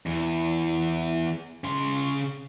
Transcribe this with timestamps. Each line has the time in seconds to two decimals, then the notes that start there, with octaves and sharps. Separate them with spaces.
0.06 E2
1.64 C#3 C6